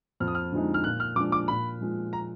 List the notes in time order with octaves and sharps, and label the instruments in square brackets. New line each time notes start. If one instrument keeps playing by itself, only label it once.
[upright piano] F2 [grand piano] F6
[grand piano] D#6
F6
[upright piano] D3 F3 G#3 D#4
[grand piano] F6
[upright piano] A#2 [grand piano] F#6
[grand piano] F6
[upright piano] F3 G#3 D4 [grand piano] D6
[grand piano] D6
[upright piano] A#2 [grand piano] B5
[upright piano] F3 G#3
[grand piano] A#5